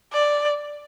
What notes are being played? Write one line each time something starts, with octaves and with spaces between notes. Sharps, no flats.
D5